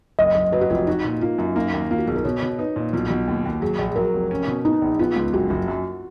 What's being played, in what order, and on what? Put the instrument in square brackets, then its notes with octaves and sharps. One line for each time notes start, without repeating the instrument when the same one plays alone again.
[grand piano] F#1 [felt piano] D#5
[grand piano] F#1
[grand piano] F#3 [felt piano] B4
[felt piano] F#4
[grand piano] F1 [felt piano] F4
[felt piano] D#4 [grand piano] F#4
[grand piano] A#2
[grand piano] A#3 [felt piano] F4
[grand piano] F#2
[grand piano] A#3 [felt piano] D#4
[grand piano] D#2
[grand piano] A#3 [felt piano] F4
[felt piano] F#4
[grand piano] B1 [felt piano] G#4
[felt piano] A#4
[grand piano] B2 [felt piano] C#5
[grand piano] B2
[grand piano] D#4 [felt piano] B4
[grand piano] A#2
[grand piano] B1 [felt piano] F4
[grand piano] B1 [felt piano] F#4
[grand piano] D#2
D#2
[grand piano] F#3 [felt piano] G#4
[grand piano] A#1
[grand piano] F#3 [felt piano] A#4
[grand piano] F1
C#4
B2
[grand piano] B3 [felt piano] D#4
[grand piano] A#1
[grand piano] B3 [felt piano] F4
[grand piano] C#2
[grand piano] F#1 [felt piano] F#4
[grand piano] F#1
F#2